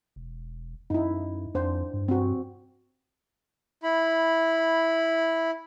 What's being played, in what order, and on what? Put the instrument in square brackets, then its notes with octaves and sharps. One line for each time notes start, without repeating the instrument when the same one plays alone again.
[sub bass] E1
[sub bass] F#2 [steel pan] D#4 E4
[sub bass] F2 [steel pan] D4 C5
[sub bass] G2
[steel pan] C4 F#4
[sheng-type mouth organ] E4 B5